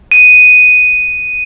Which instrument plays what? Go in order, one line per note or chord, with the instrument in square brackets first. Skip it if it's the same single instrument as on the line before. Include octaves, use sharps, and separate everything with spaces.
[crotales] D#7